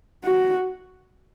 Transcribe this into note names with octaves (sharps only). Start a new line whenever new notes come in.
F#4